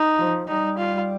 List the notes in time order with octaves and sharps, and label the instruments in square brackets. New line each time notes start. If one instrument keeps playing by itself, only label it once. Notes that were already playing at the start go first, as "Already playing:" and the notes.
Already playing: [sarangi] D#4
[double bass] F3
[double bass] G3 [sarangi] D#4
[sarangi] F4